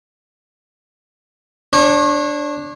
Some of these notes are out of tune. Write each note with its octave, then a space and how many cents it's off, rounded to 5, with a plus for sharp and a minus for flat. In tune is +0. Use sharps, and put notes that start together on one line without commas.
D4 +0 C#5 -35